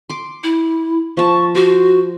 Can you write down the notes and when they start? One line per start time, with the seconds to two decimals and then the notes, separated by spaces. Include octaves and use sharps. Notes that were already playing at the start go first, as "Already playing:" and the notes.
0.09 C6 D6
0.43 E4
1.17 F3 A5 C#6
1.55 F#4 C5